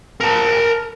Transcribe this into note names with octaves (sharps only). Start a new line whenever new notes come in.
A#4 A5